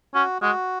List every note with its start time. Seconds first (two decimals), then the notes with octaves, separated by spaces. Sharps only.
0.15 C#4 F#4
0.42 G#3 F#4